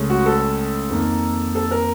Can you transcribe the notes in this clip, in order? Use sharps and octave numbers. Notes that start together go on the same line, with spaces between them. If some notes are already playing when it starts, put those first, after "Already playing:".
Already playing: C#2 C#3 A3
F#4
A4
F2 D#3 A#3
A4
A#4